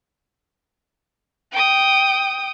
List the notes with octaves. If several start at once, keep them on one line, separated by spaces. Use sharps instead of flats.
G5 D#6